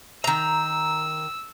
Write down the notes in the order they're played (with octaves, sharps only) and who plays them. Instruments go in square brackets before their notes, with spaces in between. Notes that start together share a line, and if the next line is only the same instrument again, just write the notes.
[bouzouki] D#3 A#5 [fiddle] E6